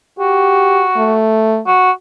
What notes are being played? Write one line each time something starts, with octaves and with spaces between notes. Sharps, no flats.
F#4 G4
A3
F#4